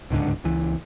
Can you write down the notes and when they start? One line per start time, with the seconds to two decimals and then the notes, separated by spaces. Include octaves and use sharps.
0.10 D1 C#2 G#2 D3
0.44 C#2 E3